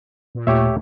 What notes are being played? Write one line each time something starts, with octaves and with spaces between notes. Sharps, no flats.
A#2
D#2 A#2 A3 G4 C#5 E5